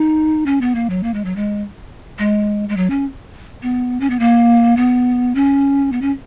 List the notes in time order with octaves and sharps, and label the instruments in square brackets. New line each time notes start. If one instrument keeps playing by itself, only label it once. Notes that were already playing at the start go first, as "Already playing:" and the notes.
Already playing: [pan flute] D#4
C#4
B3
A#3
F#3
A#3
G#3
F#3
G#3
G#3
G#3
F#3
C#4
B3
C#4
B3
A#3
B3
C#4
B3
C#4